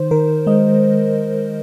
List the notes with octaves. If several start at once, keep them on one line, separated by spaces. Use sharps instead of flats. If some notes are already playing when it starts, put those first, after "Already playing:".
Already playing: D#3 C5
D#3 A#4
G#3 D#5